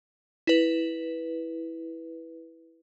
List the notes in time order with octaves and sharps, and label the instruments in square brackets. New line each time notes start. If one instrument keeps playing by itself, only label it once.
[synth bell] E4 B4